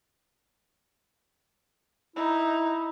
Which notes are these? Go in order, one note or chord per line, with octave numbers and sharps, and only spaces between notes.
D#4 E4